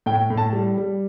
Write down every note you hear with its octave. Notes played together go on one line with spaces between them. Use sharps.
A2 G5
A2
A5
G3
G3